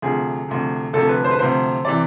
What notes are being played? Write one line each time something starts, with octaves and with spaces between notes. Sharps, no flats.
D2 C3 F3 G#4
D2 C3 F3
D2 C3 F3 A4
B4
C5
B4
D2 C3 F3 C5
C3 E3 D5